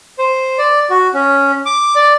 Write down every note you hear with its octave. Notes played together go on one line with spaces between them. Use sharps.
C5
D5
F#4
C#4
D6
D5